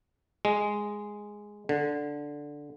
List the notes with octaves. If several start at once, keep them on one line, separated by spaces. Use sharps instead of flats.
G#3
D3